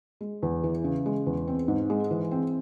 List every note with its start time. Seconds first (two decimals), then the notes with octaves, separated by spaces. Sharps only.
0.21 G#3
0.43 E2
0.64 E3
0.84 C#3
1.06 G#3
1.27 E2
1.48 C4
1.68 G#2
1.90 G#3
2.11 E3
2.31 C4